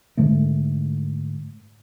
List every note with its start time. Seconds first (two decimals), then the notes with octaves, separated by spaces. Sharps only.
0.17 G#2 D3 G#3 A3